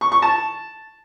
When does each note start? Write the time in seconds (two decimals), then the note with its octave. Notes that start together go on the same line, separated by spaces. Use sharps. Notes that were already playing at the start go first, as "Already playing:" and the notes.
0.01 C#6
0.12 C#6
0.22 A5